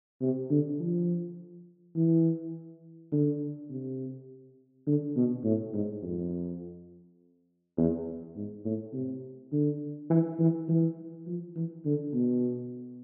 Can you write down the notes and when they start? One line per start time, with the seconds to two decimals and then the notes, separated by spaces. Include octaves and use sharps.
0.21 C3
0.51 D3
0.80 F3
1.96 E3
3.12 D3
3.70 C3
4.87 D3
5.16 B2
5.44 A2
5.73 G#2
6.03 F2
7.77 E2
8.36 G#2
8.65 A2
8.94 C3
9.52 D3
10.10 E3
10.40 E3
10.69 E3
11.27 F3
11.56 E3
11.85 D3
12.14 B2